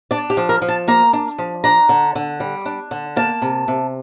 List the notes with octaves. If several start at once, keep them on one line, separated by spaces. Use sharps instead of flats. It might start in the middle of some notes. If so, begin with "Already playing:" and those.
D4 D5
G4
F3
A#4
F3
A5
A#3 A#5
D4
F3
D4 A#5
D3
D3
G3
D4
D3
A#3 A5
C3
C3